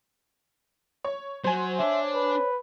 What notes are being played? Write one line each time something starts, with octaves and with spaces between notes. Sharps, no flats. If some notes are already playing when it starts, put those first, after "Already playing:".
C#5
F#3 C5 G#5
D4 C#5 E5
B4